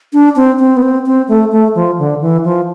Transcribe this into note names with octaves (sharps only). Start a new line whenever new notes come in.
D4
C4
C4
B3
C4
C4
A3
A3
F3
D3
E3
F3